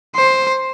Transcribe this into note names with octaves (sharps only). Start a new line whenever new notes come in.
C5